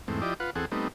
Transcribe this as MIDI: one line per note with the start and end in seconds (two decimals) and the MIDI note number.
0.08 0.21 40
0.08 0.21 44
0.08 0.21 57
0.08 0.21 60
0.22 0.34 53
0.22 0.34 64
0.22 0.34 67
0.22 0.34 74
0.22 0.34 75
0.40 0.50 65
0.40 0.50 71
0.40 0.50 78
0.56 0.65 40
0.56 0.65 60
0.56 0.65 68
0.56 0.65 69
0.56 0.65 78
0.72 0.88 55
0.72 0.88 57
0.72 0.88 59
0.72 0.88 60
0.72 0.88 63